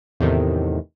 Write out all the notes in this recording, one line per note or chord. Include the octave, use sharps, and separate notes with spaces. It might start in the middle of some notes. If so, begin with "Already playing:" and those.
E2 A2 C3 D#3